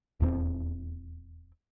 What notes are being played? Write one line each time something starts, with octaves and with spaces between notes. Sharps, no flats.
D#1 E2 F#3 C4